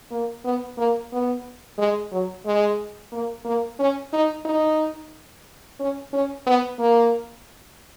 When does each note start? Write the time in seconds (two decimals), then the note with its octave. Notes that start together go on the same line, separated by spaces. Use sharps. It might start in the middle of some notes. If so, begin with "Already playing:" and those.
0.11 A#3
0.44 B3
0.78 A#3
1.12 B3
1.78 G#3
2.11 F#3
2.46 G#3
3.12 A#3
3.45 A#3
3.79 C#4
4.13 D#4
4.45 D#4
5.80 C#4
6.13 C#4
6.47 B3
6.79 A#3